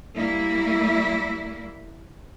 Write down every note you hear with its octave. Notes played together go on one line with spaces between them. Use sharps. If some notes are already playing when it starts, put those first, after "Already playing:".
G3 A#3 E4